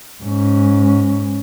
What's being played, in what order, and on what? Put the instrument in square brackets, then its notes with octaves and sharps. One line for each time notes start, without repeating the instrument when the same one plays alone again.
[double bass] G#2 C#4